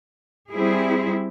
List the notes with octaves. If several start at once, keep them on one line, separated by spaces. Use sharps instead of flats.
G3 C4 E4 G#4